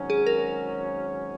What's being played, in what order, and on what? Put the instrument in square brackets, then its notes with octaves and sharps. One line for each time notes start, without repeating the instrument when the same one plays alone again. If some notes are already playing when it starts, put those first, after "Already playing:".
Already playing: [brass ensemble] G#1 G#2 F#3 C#4
[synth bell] G#4
A#4